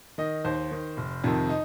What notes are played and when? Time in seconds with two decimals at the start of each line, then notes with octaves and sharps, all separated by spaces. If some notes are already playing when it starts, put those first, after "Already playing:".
0.18 D#3 D#5
0.45 D#2 C5
0.71 D#3
0.97 F1
1.24 F2 C3 D#3
1.49 D#4